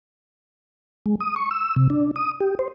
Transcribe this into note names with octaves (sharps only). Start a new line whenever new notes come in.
G#3
D#6
C#6
E6
C3
D4
D#6
G4
C5